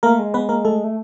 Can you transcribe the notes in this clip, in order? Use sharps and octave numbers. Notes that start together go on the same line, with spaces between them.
A3 A#3 A#4
G#3
B3 B4
A#3 A#4
A3 A4
A3